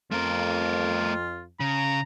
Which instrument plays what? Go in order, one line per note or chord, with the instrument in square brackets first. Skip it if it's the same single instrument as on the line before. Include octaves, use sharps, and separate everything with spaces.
[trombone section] F2 [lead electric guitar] A3 A#4 [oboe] F4
[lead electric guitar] C#3 [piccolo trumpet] A#5